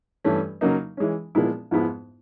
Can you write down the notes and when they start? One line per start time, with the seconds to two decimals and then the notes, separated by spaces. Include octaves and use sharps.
0.24 G2 E3 A3 C#4
0.61 C#3 F#3 A#3 D#4
0.97 E3 G#3 C#4
1.35 A#2 F3 G#3 B3 E4
1.71 G#2 F3 G#3 B3 E4